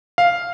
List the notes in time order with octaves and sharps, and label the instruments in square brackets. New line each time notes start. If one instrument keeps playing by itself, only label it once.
[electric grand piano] F5